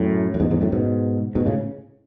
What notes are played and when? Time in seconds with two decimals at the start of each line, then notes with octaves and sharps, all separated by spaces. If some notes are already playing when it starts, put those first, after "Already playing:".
Already playing: F#2 A2
0.34 F#2
0.40 E2 G#2
0.51 E2 G#2
0.61 F#2 A2
0.72 G#2 B2
1.35 G#2 B2
1.46 A2 C#3